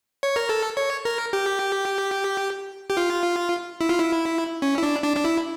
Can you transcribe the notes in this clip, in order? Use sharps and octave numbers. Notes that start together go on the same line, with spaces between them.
C#5
A#4
A4
C#5
A#4
G4
G4
F4
E4
F4
E4
C#4
E4
D4
D4
D4
E4